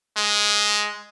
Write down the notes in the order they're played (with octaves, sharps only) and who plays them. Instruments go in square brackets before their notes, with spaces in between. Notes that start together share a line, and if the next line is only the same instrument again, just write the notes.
[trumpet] G#3